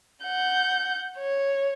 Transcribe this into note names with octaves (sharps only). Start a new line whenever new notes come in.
F#5 G6
C#5